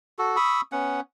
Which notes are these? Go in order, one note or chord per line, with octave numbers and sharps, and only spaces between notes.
F#4 A4
B5 C#6 D#6 E6
B3 C#4 F#5